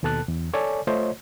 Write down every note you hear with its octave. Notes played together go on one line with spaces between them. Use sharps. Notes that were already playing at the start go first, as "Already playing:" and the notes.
D#2 B2 A4 A5 F#6
E2
A4 C#5 D5 G#5
A3 F4 C5 C#5 D#5